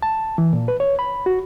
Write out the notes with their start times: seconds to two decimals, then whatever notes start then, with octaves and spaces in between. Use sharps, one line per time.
0.03 A5
0.38 E3
0.53 A#2
0.68 B4
0.80 C#5
0.99 B5
1.26 F#4